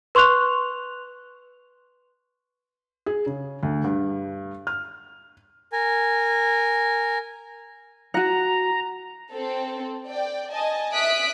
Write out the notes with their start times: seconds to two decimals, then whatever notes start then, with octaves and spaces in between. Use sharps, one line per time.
0.15 B4 C6 C#6 F#6 F7
3.06 G#4
3.26 C#3
3.63 D2
3.84 G2
4.67 F6
5.72 A#4 G#5
8.14 F#4 F#5 A#5
9.31 C4 A4
10.07 D5 G5
10.52 D#5 G#5 A5
10.93 E5 D#6 F#6 B6 D7